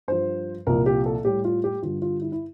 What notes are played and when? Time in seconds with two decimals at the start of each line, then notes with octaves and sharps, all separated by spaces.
0.08 G2 F3 C5
0.67 C2 A#2 F3 A#4
0.86 G4
1.06 A4
1.24 A2 G3 G4
1.45 F4
1.64 G4
1.83 G2 D3 G3 F4
2.02 F4
2.22 E4
2.32 E4